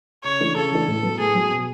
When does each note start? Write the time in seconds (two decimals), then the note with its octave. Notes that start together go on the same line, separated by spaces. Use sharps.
0.24 C#3 C#5
0.40 E3 A3 D4
0.56 C#3 A4
0.71 E3 A3 D4
0.88 A2
1.03 F#3 B3
1.19 A2 G#4
1.35 F#3 B3
1.51 B2